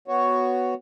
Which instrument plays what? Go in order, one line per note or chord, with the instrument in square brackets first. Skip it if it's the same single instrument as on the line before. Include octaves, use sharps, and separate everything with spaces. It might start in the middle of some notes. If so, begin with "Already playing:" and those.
[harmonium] B3 F#4 C#5